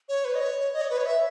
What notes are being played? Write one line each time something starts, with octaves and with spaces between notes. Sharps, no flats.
C#5
B4
D#5
C#5
D#5
C#5
B4
C#5
E5